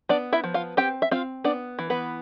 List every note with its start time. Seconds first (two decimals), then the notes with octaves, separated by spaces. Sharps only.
0.09 B3 D4 D5
0.33 E4 E5
0.44 F3
0.54 F4 F5
0.77 C4 G4 G5
1.02 E5
1.11 C4 F4 F5
1.44 B3 D4 D5
1.79 E3
1.90 B3 B4